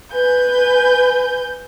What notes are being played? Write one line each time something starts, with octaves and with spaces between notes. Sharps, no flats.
B4 G#5 G6